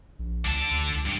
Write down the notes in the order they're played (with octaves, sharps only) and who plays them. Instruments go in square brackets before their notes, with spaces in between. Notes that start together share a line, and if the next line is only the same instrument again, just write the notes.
[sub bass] A#1
[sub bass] C#2 [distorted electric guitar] D3 A5
[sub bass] D2
C#2
[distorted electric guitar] G2 G4